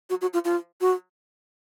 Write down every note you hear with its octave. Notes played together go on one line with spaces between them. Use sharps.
F#4
F#4
F4
F4
F#4